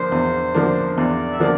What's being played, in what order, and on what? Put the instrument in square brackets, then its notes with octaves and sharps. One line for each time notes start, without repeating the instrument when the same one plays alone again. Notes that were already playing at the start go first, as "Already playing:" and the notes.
Already playing: [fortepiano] D3 F3 A#3 D4 [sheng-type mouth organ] C5
[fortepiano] E2
D3 F3 A#3 D4
[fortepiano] E2 [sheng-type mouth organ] D5
[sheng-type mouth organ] E5
[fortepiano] D3 F3 A#3 D4 [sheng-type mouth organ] D5